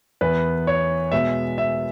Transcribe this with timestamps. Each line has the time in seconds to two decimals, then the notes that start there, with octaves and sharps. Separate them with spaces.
0.21 E2 E3 B3 B4
0.67 C#5
1.12 B2 G#3 B3 E5
1.58 E5